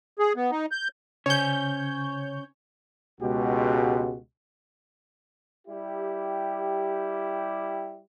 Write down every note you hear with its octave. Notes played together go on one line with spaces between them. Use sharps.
G#4
B3
D#4
G6
C#3 C#4 C5 C#5 G#5 G6
C#2 B2 G#3 F#4 G4
G3 E4 G4